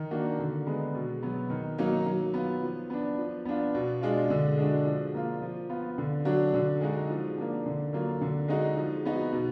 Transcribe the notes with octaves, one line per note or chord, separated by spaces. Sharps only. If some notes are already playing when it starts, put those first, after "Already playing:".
Already playing: D#3
A#3 D4 F#4
D3
G#3 B3
B2
F#3 B3
D#3
F#3 A#3 D#4
F#3
B3 F4
F3
B3 D4
F3
B3 D4 F4
B2
G#3 D4 F4
D3
G#3 D4 F#4
F3
A#3 F4
F3
B3 F4
D3
F#3 D4 F#4
D3
G#3 D#4 F#4
F3
A#3 D4
D3
F#3 A#3 F4
D3
G#3 D#4 F#4
F3
B3 D#4 F#4
B2